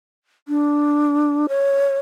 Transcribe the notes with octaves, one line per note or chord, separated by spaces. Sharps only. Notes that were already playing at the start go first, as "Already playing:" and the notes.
D4
C#5